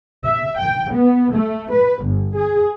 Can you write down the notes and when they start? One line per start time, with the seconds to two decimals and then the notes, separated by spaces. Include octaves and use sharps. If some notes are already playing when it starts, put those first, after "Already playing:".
0.25 E5
0.58 G5
0.92 B3
1.34 A3
1.71 B4
2.04 G1
2.37 G#4